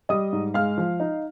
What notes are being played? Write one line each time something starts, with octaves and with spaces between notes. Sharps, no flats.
G3 D#5 D#6
G#2
G#3 F5 F6
F3
D#4